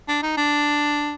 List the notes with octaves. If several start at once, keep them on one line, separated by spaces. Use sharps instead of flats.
D4
D#4
D4